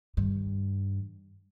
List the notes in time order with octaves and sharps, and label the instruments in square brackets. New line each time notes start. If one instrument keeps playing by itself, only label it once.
[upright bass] G2 D#3